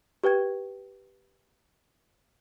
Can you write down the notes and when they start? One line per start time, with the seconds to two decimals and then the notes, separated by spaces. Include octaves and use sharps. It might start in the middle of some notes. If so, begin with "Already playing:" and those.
0.24 G4 B4 G5 G#6